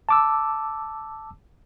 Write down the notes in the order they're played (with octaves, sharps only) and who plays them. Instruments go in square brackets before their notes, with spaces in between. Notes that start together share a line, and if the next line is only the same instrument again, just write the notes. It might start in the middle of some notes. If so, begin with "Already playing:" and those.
[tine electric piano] A5 D6 E6